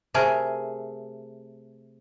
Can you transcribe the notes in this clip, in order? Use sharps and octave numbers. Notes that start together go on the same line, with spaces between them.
C3 A3 G#4 A#4